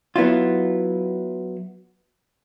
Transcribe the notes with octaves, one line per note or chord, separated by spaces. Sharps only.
F#3 B3 E4 F4